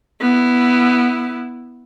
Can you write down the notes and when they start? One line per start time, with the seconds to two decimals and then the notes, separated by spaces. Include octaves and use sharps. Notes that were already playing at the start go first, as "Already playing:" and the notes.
0.21 B3 E4